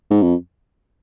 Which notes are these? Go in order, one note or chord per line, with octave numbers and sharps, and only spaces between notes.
G#2
F2